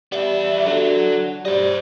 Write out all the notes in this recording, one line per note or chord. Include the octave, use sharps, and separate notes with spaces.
G3 B3 E5
D3 F#3 F#4
G3 C5 D#5